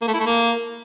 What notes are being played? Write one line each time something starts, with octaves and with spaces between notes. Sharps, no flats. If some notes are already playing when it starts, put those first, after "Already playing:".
A#3
A3
E4
A3
A#3